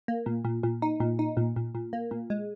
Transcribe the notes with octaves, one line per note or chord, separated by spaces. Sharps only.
A#3
A#2
A#2
A#2
D#4
A#2
D#4
A#2
A#2
A#2
A#3
A#2
G#3